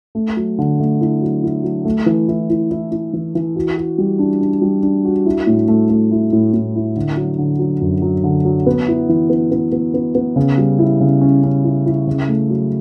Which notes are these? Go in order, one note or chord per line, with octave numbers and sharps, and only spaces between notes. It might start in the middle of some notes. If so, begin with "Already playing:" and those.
A3
F#3
D3
A3
E4
F#3
E4
F#3
A3
E3
E4
E4
E4
E4
E3
E3
F#4
F#4
G3
D4
D4
G3
D4
F#4
E4
A2
A3
A3
E4
A2
A2
E4
D3
F#3
D3
F#3
F#2
F#3
D3
F#3
B3
E4
E3
B3
B3
B3
B3
B3
C#3
G3
E4
C#3
C#4
C#4
E4
E4
C#3
A3
F#3